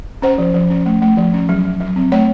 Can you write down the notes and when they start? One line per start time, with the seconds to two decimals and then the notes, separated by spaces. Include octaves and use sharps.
0.22 C#4 C5
0.38 F3
0.54 F3
0.70 C#4
0.86 A3
1.02 A3
1.17 F3
1.34 C#4
1.49 F#3
1.64 F#3
1.80 F#3
1.96 C4
2.12 A3 C#5